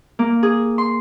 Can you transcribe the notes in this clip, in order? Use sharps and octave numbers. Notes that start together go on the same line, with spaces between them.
A#3
G#4
C6